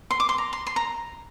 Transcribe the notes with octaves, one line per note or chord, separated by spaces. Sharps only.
C6
D6
C6
A#5
C6
C6
A#5